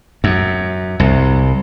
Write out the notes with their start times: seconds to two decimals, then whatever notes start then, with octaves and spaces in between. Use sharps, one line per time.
0.24 F#2
1.00 C2